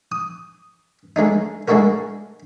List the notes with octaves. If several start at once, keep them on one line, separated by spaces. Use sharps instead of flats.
D#6
G#3 A3 D4 D#4
G#3 A3 D4 E4 F#4 A#4